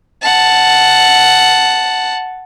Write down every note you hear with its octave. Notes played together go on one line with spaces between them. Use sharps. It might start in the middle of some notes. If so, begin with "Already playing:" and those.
F#5 A5